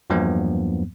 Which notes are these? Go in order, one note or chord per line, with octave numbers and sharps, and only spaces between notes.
E2 G2 F3 F#3 A#3 B3